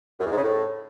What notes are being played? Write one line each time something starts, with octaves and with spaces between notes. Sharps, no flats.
F#2
E2
G#2
C#3
A2